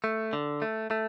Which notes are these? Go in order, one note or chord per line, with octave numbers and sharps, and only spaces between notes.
A3
D3
A3
A3